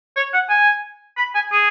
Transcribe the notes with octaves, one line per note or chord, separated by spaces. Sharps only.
C#5
F#5
G#5
B5
G#5
G#4